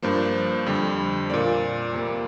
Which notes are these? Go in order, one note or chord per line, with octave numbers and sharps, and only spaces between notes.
G2 F3 A#3 C5
F2 D3 G3
A#2 A#3 D5
F2 C3 A#3